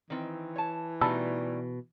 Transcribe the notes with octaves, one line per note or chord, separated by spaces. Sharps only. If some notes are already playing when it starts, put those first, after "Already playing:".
D#3 E3 C4
C#5 A5
B2 G3 A3 D#4 A5 B5 E6